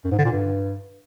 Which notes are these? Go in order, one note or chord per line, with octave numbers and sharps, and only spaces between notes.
F#2
G#2
D3
A#2
G2